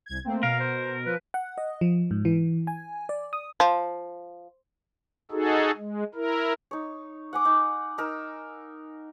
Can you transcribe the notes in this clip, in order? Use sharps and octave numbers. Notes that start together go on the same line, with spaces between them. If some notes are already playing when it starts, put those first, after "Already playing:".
C2 G#6
A3 A#3 C4
B2 A#4 F5
C5
F3 B4
F#5
D#5
F3
G#2
E3
G#5
D5
D#6
F3
D#4 F#4 G#4 A4
G#3
E4 A#4
D#4 C#5
F#5 G#5 D6
D#4
D#4 A#4 E6